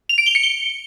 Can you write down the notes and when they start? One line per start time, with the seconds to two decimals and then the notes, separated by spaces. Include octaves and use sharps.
0.09 F7
0.18 D7
0.26 G7
0.35 C#7
0.43 G7